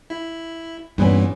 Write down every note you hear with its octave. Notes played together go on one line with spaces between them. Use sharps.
E4
G2 A#2 E3 B3 C#4